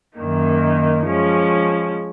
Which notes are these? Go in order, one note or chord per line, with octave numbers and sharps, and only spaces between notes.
F#2 D#3 A#3 D#4
F3 G#3 C#4